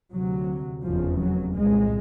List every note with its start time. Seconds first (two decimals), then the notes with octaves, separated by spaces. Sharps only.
0.13 D2 C3 F#3
0.84 F1 E2 C#3 F3
1.19 F#3
1.53 C2 A#2 G#3